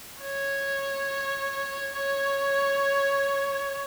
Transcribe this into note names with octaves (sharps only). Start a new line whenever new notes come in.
C#5
C#5